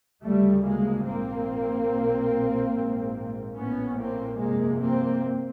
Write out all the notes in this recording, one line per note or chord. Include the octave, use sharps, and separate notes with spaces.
D2 C#3 G3 A3
G#3 A#3
A#1 G#2 A#3 C4
B1 A#2
A#1 G#2
A#1 A2 B3 C#4
A#3 C4
G1 F2 C3 G#3 A#3
A#3 C4